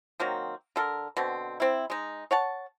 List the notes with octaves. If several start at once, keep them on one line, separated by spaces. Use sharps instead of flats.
D#3 F#3 A#3 C4
D3 A4 A#4
B2 D3 C4
C4 E4
G#3 D#4
C#5 F#5 A5